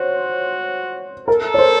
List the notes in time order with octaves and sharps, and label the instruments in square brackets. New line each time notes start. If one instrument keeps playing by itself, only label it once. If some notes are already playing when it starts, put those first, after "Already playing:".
Already playing: [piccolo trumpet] F#4 [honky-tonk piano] C5 C#5
[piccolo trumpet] A4 [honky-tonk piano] A#4
[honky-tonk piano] C#5
C5